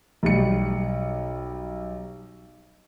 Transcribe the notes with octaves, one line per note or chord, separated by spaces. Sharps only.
B1 G3 C#7